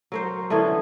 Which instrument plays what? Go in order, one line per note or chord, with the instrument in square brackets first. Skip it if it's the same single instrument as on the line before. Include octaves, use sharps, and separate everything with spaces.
[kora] F#3 A#4 C5
D3 E3 B3 C#4